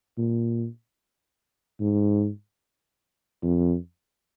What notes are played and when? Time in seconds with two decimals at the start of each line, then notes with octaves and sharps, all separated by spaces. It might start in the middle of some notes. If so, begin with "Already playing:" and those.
0.18 A#2
1.80 G#2
3.43 F2